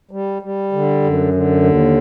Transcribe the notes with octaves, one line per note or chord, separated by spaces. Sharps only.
G3
G3
D3
F#2
D3
D#2